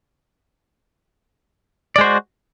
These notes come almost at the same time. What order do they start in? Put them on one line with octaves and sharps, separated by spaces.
D5 G#3 C5 F#4